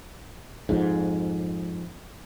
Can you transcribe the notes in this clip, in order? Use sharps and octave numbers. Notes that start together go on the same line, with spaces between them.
F2 G#2